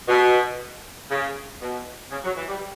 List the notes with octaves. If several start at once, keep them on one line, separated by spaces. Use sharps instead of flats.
B2
C#3
B2
C#3
F#3
E3
G3